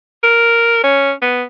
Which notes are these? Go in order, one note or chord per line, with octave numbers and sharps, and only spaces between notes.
A#4
C#4
B3